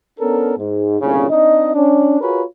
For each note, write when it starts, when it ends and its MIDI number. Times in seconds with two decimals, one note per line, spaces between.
0.20 0.55 59
0.20 0.55 61
0.20 0.55 62
0.20 0.55 69
0.20 0.55 70
0.58 0.99 44
1.00 1.27 31
1.00 1.27 36
1.00 1.27 46
1.00 1.27 49
1.30 1.73 60
1.30 1.73 62
1.30 1.73 63
1.30 1.73 75
1.75 2.20 61
1.75 2.20 62
2.21 2.42 65
2.21 2.42 66
2.21 2.42 68
2.21 2.42 70
2.21 2.42 71
2.21 2.42 73